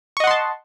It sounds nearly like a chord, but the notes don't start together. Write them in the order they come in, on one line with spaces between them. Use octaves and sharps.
C#6 D#5 F#5 C6 A5